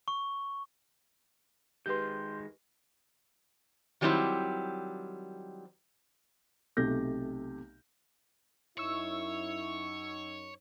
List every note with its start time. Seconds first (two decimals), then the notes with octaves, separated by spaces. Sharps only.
0.08 C#6
1.86 D#3 G#3 G4 B4 C6 G6
4.01 D#3 F#3 G3 C4 E4 C5
6.77 B1 C3 A3 G4 G6 A#6
8.78 F#2 D#4 E4 C#5 C#6 E6